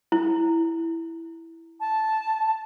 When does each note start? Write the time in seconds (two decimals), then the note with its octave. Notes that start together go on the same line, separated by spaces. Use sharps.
0.12 E4
1.80 A5